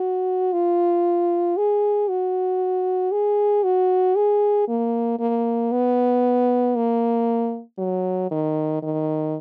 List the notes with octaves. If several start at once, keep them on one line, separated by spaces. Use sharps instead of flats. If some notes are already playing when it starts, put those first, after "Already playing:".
Already playing: F#4
F4
G#4
F#4
G#4
F#4
G#4
A#3
A#3
B3
A#3
F#3
D#3
D#3